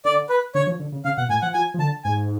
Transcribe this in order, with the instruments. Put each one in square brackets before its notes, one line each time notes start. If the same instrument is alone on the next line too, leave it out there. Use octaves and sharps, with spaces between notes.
[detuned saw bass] D3 [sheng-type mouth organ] D5
[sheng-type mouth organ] B4
[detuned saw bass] D3 [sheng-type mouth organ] C#5
[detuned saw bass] F3
D3
C#3
[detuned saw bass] C#3 [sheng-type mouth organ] F5
[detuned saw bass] B2 [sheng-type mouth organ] F#5
[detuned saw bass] A2 [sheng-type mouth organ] G#5
[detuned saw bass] F3 [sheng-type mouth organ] F#5
[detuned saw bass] F3 [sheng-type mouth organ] G#5
[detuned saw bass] F3
[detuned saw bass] D3 [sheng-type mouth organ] A5
[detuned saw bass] G#2 [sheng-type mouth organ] G#5